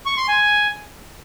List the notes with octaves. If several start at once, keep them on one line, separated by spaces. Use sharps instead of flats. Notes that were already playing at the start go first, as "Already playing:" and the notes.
C#6
C6
G#5